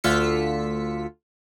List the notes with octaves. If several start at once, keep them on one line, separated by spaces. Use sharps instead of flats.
D2 D3 F4 E6 B6 C#7